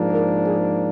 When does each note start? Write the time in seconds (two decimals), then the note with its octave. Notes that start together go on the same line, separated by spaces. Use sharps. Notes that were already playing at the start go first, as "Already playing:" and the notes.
Already playing: G#2 F3 A#3 D4
0.11 A#4
0.46 G#4